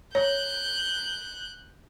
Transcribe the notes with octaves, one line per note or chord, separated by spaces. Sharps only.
C#5 F#6 G6